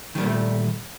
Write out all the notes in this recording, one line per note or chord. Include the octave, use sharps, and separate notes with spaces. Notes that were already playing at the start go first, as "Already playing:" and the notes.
A#2 D#3 G3 A3 A#3